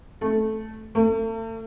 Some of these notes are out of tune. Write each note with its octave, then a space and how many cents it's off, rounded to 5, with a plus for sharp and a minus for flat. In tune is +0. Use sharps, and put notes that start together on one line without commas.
A3 -10
A3 +40